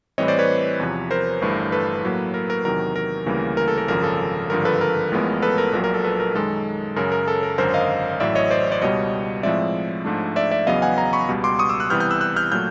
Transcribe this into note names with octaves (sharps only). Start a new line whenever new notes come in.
A2 E3 G3 C4 C#5 D#5
C5 D5
B4 C#5
E2 C3 F3
A#4 C5
G1 G2 E3 A3
A4 B4
A2 F#3 A#3
A#4
A#4
E2 C3 D#3 F#3 A#4
A#4
D2 C#3 E3 G3 A#3
A#4
A4
A#4
G#1 F#2 C#3 F3 A#4
A4
G#1 G2 D3 F3 A#4
A4 B4
A#4
A1 A2 F3 G#3 B3
A4 B4
A#4
A#1 A#2 F#3 A#4
A#4
A4
A4 B4
A#4
F#2 D#3 G#3 A4
F#2 C#3 F#3 A#4
A#4
A4
A#4
G#1 F#2 D3 A#4 C5
D#5 F5
A1 A2 F#3 D5 E5
C#5 D#5
C5 D5
C5 D5
C#2 B2 G3 C#5 D#5
A2 F3 G#3 C4 D5 E5
G#2 F3 A3 D4
D5 E5
D5 E5
E2 C#3 F#3 B3 D#5 F5
F#5 G#5
G#5 A#5
B5 C#6
C#2 B2 G3
C6 D6
C#6 D#6
D6 E6
E6 F#6
C2 C3 E3 G3 B3 F6 G6
F6 G6
E6 F#6
E6 F#6
F6 G6
A#2 F#3 A3 F6 G6